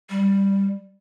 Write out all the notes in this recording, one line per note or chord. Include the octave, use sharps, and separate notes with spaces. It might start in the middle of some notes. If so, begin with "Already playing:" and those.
G3